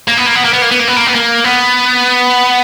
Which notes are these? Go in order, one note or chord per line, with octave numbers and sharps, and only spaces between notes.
A#3
B3
A#3
B3
A#3
B3
A#3
B3
A#3
B3
A#3
B3
A#3
B3